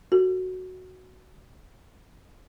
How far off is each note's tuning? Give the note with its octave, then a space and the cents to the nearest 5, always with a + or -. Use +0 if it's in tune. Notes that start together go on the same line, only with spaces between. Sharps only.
F#4 +0 A4 +45